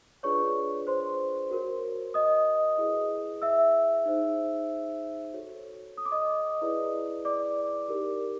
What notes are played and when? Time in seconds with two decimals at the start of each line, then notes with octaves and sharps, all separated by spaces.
0.23 D4 F4 G#4 B4 C#5 D5 C#6
0.87 C5 C6
1.51 F#4 A#4 C#5
2.14 D#5 D#6
2.78 E4 G#4 B4
3.42 E5 E6
4.05 D#4 G#4 C5
5.33 F#4 A4 C#5
5.98 D#6
6.05 D6
6.12 D#5 D#6
6.62 E4 G#4 B4 D5
7.25 D5 D6
7.88 D#4 G4 A#4